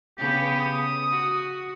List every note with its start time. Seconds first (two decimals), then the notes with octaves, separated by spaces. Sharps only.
0.18 C#3 B3 G4
0.60 D#6
1.11 F#4